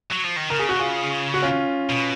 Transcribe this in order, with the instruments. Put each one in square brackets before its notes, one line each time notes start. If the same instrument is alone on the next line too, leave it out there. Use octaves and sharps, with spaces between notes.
[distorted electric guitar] F#3
F3
D#3
[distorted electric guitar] C#3 [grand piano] A#4
[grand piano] G#4
F#4
F4 G#4
F#4
C#4 F4
[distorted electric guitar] B2